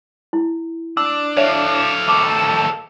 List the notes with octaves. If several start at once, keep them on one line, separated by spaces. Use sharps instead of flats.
E4
D4 E6
A4 C#5 E5 F5
D#2 A3 D6